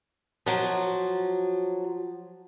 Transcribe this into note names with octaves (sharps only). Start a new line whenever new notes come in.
F3 F#3